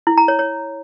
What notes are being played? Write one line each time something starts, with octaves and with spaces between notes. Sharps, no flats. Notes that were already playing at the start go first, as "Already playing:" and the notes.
E4
A#5
C#5
C#5